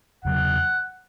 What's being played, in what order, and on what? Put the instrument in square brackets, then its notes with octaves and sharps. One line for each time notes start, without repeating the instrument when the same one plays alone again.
[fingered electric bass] E2 C#3 F#3 [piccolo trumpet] F#5